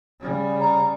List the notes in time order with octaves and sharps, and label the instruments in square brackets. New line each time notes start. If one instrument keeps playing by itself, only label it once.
[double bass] C#3 G3
[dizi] A#5